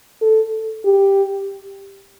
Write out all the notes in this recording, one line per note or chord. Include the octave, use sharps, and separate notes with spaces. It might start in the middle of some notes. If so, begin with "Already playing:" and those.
A4
G4